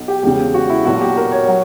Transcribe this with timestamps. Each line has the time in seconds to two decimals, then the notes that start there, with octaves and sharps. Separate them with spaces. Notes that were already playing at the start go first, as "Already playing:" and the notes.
Already playing: B1
0.08 G4
0.23 E1 E2 C#3 G4
0.54 F#4
0.70 E4
0.85 B1 A#2 F#3 F#4
1.01 G4
1.17 A#4
1.32 C#5
1.48 F#3